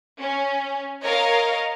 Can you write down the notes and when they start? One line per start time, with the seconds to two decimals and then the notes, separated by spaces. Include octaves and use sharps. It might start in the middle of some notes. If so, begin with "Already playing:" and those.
0.20 C#4
1.03 A#4 C#5 D#5 F5